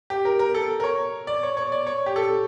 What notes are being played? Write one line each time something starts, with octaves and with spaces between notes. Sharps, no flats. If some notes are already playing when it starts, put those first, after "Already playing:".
G4
A#4
A#4
A4
A#4
C#5
D5
C#5
C#5
D5
C#5
G4
A4